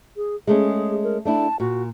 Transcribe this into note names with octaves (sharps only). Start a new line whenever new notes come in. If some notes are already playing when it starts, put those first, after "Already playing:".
G#4
G#3 A3 C#4 G#4
A#4
A3 D4 E4 A5
A#2 F#4